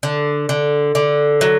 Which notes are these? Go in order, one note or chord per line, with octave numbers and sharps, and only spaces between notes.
D3
D3
D3
F#3